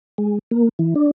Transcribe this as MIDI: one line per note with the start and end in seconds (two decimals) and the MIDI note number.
0.18 0.39 56
0.51 0.69 58
0.79 0.94 52
0.95 1.11 62